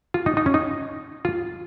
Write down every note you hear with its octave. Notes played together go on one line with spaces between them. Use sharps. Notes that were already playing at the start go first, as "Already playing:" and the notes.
F4
D#4
D#4
C#4
D#4
F4